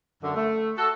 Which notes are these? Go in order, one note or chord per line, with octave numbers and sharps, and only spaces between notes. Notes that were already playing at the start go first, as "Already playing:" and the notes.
F#2 D3
A3
F#4 A4